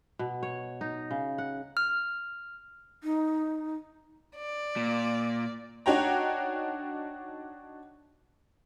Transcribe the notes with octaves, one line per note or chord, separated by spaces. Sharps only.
B2
C#5
D#4
C#3
F#5
F6
D#4
D5
A#2
D4 D#4 F#4 C#5 G5 A#5